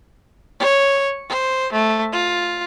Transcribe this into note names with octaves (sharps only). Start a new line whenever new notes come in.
C#5
C5
A3
F4